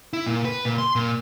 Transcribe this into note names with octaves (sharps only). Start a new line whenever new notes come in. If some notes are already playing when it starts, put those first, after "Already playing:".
E4
A#2
B4
A#2
C6
A#2